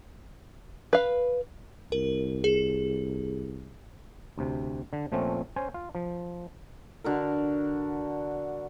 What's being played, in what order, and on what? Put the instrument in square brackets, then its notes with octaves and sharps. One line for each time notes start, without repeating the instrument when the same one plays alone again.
[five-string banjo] B4 F5
[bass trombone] C2 [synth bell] A#4
[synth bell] G#4
[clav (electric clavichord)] D2 C3
D3
A#2 F3 A3 C4 C#4
C#4 C5 G#5
F4
F3
[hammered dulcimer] D3 F#4 A#4